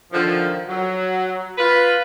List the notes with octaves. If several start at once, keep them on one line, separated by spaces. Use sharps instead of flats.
D3 D#3 F3
F#3
F4 B4